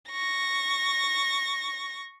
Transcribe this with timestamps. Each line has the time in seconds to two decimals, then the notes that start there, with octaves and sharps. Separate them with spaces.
0.10 C#6 A#6